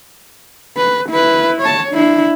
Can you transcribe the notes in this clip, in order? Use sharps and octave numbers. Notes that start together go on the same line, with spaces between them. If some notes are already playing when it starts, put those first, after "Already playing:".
B4
E4 B4
C#5 A5
D4 E4